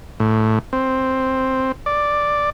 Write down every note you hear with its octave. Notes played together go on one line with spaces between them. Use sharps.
A2
C4
D5